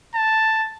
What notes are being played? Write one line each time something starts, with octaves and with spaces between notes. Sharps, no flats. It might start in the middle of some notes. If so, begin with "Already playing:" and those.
A5